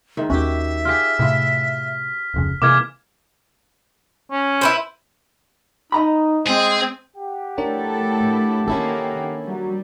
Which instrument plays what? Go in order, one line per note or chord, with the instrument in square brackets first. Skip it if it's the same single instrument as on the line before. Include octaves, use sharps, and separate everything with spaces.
[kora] G#2 D#3 E5
[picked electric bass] D#2 C#4 [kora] F#4 G4 [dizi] E5
[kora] F4 G4 G#4 [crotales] F6 B6
[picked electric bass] A2 C3 [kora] E4 F4
[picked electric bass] D1 F2 C#3
[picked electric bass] C3 [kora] E3 G#3 A#3 [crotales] D6 F6 G#6
[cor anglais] C#4
[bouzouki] E4 B4 C5
[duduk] D#4 [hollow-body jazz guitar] D#5 A#5 B5
[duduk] G#3 [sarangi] C4 [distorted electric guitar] G#4
[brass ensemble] G4 F#5 G5
[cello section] A3 E4 A4 [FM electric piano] D4 A#4 C#5
[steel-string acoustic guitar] A2
[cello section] D#3 A#3 [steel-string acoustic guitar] C#4 E4 A4
[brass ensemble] F#3 [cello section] G3